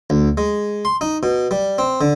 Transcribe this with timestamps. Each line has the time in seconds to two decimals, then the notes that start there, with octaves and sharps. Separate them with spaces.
0.10 D2
0.37 G#3
0.85 C6
1.01 D#4
1.23 B2
1.51 G3
1.78 C4
2.01 D3